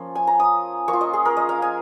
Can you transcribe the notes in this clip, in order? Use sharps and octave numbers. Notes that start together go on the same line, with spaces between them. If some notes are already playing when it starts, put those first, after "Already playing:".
Already playing: F3 A#3 C#4
G#5
A#5
D#6
A#3 C#6
F4
D#5
G#4
A#4
D#5
F5
G#5